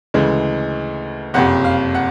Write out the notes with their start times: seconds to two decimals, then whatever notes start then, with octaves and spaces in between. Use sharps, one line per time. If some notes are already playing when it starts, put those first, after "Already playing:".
0.14 D2 C#3 E3 G#3
1.34 F#1 F2 C3 F#5
1.65 F5
1.95 F#5